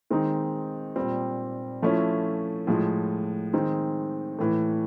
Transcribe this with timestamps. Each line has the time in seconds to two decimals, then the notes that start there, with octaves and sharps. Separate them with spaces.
0.11 D#3 G#3 C4 D#4
0.96 A#2 G3 C4
1.82 F3 A3 C#4 E4
2.67 A2 F3 G#3
3.53 D#3 G#3 C4 D#4
4.39 A2 E3 A3